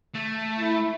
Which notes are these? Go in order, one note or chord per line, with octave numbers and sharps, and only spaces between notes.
A3
E4